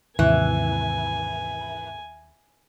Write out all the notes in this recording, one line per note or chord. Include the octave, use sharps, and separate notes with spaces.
D#2 G#2 C3 E3 G#5